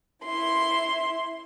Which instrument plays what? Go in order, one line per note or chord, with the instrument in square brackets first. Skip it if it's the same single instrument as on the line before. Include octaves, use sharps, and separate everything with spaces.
[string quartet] E4 C6